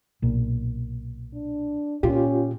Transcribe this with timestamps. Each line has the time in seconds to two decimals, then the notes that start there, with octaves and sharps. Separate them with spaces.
0.22 B1 A#2
1.34 D4
2.03 A#2 C#4 F4 G4